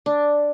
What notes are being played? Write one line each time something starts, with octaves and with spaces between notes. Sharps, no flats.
D4